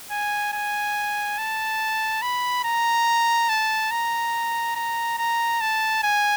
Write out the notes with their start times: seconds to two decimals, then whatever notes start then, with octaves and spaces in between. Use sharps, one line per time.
0.11 G#5
0.53 G#5
1.38 A5
2.22 B5
2.64 A#5
3.49 A5
3.91 A#5
4.76 A#5
5.18 A#5
5.61 A5
6.03 G#5